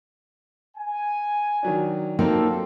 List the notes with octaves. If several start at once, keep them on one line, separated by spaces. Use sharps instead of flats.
G#5
D#3 F#3 D4
F#3 A#3 C4 D#4 F4 A4